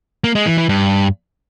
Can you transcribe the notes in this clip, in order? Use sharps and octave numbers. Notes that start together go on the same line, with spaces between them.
A#3
G#3
E3
E3
G2